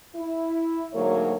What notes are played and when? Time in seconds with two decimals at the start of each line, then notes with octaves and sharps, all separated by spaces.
0.15 E4
0.93 D2 G#2 F#3 A#3 C#5